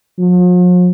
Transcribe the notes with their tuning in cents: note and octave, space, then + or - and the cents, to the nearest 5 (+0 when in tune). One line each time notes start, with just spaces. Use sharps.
F3 +45